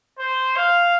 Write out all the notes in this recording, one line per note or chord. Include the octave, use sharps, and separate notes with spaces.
C5
F5